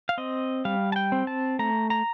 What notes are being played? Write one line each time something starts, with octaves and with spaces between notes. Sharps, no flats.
F5
C4 D#5
G3 F5
A5
G5
C4
A5
A3 A#5
A#5